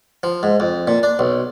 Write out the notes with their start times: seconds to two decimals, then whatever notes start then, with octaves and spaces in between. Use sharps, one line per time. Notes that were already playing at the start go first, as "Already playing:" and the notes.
0.23 F3
0.43 G#2
0.60 F2
0.87 A#2
1.03 D4
1.19 B1